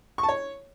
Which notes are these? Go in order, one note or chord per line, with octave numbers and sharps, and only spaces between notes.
C#6
A5
C#5